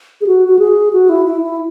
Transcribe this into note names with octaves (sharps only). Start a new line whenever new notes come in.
G#4
F#4
F#4
G#4
F#4
E4
E4
E4